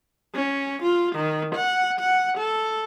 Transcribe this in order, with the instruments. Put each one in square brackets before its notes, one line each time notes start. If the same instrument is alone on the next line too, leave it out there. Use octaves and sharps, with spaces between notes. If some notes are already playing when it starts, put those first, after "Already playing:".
[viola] C#4
F4
D#3
F#5
F#5
A4